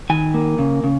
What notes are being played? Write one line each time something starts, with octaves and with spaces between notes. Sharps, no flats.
D#3 G#5
A#3
C#3
C#3